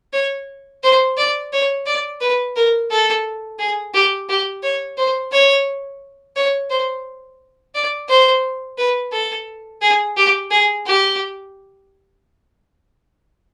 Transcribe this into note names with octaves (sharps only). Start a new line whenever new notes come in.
C#5
C5
D5
C#5
D5
B4
A#4
A4
G#4
G4
G4
C#5
C5
C#5
C#5
C5
D5
C5
B4
A4
G#4
G4
G#4
G4